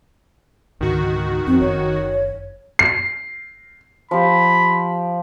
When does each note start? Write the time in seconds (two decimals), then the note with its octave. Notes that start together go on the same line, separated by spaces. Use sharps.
0.81 C#2 G#2 D3 D#3 F#4
1.47 F2 C4
1.60 F#1 C#5
2.79 C7
4.11 F3 G4 B5